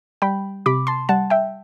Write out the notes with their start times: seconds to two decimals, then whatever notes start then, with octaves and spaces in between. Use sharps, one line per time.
0.22 G3 G5 B5
0.66 C3 B5 D6
0.87 A5 C6
1.09 G3 F#5 A5
1.30 E5 G5